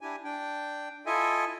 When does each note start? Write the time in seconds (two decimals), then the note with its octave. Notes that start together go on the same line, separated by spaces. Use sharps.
0.01 D4 E4 G4 G#5
0.24 D4 G5
1.06 E4 F4 A4 D#5 E5 G#5